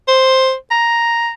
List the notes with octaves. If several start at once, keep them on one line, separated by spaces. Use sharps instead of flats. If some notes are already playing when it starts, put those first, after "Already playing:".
C5
A#5